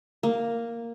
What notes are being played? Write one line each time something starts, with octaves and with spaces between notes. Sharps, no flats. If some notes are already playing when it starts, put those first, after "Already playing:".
A#3